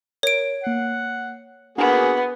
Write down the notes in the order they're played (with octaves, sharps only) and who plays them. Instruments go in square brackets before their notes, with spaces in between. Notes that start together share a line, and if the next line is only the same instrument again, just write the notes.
[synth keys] A#4 [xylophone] C#5 D7
[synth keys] A#3 C7 [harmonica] F#5
[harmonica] A#3 F#4 G#4 [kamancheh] B3 [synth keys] D4 G#5 C#6